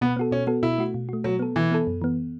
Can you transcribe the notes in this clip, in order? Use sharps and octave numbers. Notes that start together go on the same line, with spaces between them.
B2 B3
B3 F#4 A4
B2 C#4
B3 F#4 A4
B2 E4
A3 F#4
B2
A3 F#4
B2 F#3
B3 A4
B2 E3
B3 A4
F#2
E3 B3